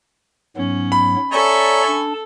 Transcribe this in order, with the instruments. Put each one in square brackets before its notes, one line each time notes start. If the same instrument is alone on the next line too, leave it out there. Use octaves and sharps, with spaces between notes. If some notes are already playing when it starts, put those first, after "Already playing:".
[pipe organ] G#2 F#3 B3 [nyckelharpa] C#4
[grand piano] B5
[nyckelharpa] A4 [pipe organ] C#5 D5 A#5 [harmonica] E5 G#5 C#6
[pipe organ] D4 A5